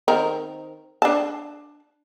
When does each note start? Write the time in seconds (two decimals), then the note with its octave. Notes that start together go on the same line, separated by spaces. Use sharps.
0.08 D#3 C4 A#4
1.02 D4 A5